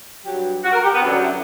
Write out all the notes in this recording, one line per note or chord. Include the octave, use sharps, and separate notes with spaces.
G2 F#3 G4
F#4
A#4
G4
B3
F#2 D3 F#3 D4
E4